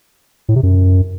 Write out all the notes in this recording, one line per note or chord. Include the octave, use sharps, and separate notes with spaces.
A2
C3
F#2